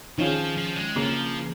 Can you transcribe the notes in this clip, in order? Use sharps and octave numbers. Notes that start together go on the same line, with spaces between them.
D#3 F3 C#4 F4 G#4
F3
G#3
C#3 F3 A#3